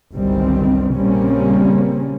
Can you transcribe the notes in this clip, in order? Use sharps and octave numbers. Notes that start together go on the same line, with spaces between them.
G1 C2 F#2 D#3 G3 C4
A#1 C#3 G3 A#3 C4 C#4